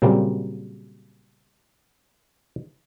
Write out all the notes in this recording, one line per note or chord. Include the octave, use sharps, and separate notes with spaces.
A#2 C#3 F#3 G3 A#3 C4